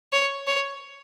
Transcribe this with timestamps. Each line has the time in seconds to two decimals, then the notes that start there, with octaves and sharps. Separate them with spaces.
0.13 C#5
0.47 C#5